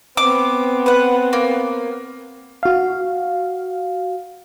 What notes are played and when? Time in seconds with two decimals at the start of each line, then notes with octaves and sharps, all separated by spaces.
0.17 B3 C4 D6
0.86 B4 F#5
1.33 A#3
2.63 F#4 F5